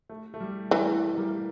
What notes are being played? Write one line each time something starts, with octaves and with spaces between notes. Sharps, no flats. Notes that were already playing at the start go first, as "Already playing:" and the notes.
A3
A3
G3
E3 G3
A3
A3
G3 A#3